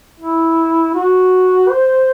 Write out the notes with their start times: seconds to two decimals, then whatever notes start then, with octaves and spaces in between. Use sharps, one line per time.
0.20 E4
0.95 F#4
1.69 C5